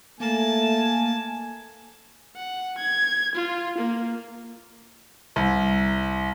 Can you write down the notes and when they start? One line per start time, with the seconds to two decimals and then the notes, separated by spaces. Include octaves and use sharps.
0.20 A3 A#3 G#5 A5
2.36 F#5
2.79 G#6
3.36 F4
3.78 A#3
5.36 C2